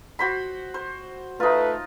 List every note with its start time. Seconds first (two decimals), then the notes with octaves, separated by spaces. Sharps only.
0.19 F#4 C5 B5
0.74 C5
1.40 A3 D#4 F4 B4